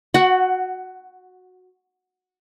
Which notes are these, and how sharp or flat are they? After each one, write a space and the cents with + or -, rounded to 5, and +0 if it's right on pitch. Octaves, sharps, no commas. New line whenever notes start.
F#4 -10 F#5 +15